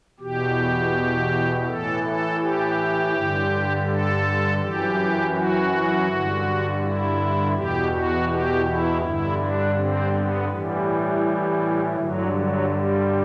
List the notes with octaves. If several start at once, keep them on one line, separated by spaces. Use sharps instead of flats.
E2 B2 G4
A2 E3 A4
A4
G4
G2 D3
A4
F#2 E3 G4
F#4
G2 D3
E4
E2 B2 G4
F#4
G4
E4
G2 D3 E4
D4
C4
B3
A2 E3 G3
D3 F#3
G2
F#3
G3